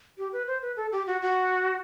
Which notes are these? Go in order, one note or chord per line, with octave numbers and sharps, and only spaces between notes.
G4
B4
C5
B4
A4
G4
F#4
F#4